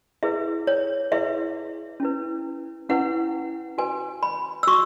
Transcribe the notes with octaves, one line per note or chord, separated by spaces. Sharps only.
E4 G#4 B4 E5
C#5
E4 G#4 B4 E5
C#4 E4 B4
C#4 E4 B4 F#5
F#4 B4 G#5
B5
E6
F#4 C#6